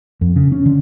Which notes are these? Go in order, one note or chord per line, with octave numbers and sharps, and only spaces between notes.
F2
C#3
C#4
D3